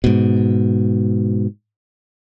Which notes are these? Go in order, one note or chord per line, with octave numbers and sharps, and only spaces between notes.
G#2 B2